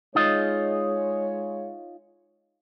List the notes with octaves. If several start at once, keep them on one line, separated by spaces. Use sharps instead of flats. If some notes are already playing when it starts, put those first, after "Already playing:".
G#3 D#4 F4 C#5 D#5